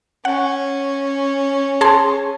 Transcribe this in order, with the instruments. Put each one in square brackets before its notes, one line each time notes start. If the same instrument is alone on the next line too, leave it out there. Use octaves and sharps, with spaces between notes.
[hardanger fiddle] C#4 [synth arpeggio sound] F#5
[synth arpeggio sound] G#4 A5 C6